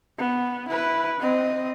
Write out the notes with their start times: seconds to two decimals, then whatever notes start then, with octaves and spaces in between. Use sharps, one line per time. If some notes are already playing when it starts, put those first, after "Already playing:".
0.18 B3
0.69 E4 B4
1.21 C4 D#5